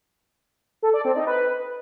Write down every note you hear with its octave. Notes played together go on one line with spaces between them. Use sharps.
A4
D5
C4
D#4
B4